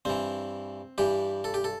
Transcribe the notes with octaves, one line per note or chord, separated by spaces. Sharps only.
G2 E3 C4
G2 E3 G4
A4
G4
A4